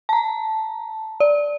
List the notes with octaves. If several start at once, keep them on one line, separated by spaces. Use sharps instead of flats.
A5 A#5
D5